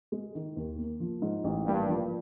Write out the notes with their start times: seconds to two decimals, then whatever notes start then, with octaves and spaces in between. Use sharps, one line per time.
0.12 G#3
0.35 D#3
0.56 D#2
0.78 A#3
1.00 F3
1.22 G#2
1.44 A1
1.66 G2 A#3
1.88 F3